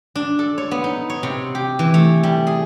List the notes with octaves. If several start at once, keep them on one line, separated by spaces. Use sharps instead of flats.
D4
A4
C#5
B3
D#4
C#5
C3
G4
E3
A3
G3
G#4